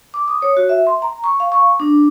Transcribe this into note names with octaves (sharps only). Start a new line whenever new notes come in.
D6
D#6
C#5
F#4
E5
C6
A#5
C#6
F5
C#6
D4